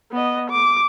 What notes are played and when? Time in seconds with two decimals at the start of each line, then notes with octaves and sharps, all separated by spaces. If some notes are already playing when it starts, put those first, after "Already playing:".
0.12 B3 D#5
0.50 D6